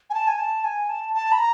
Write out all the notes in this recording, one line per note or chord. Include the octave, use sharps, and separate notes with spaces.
G#5
A5
G#5
A5
G#5
A5
A5
B5
A#5